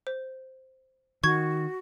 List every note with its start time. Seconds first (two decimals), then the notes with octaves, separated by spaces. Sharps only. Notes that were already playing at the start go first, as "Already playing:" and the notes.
0.07 C5
1.24 D#3 F#4 C#6 G#6